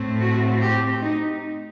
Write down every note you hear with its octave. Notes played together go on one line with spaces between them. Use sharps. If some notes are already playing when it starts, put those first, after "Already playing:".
Already playing: A2 A3 C4
F#4
G4
D#4